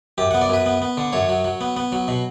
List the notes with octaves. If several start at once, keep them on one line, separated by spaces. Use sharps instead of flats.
F#2 G4
F#5
B3
D5
F#2 B4
B3
B3
D3
F#2 C#5
F#3
F#3
B3
B3
F#3
B2